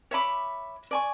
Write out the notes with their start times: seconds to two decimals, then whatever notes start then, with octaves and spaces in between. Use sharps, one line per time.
0.11 C#5 E5 B5 D6
0.91 D5 G#5 C#6